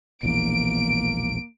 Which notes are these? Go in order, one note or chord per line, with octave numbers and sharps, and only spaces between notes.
E1 A#1 E2 A#3 D7